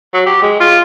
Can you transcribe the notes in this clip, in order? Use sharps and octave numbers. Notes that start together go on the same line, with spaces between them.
F#3
G4
G#3
F4